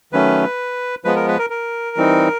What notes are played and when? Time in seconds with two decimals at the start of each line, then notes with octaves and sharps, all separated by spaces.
0.12 D#3 F#3 A3 C#4 B4
1.05 F3 G#3 B3 B4
1.16 A#4
1.28 B4
1.39 A#4
1.50 A#4
1.97 E3 G3 C4 D#4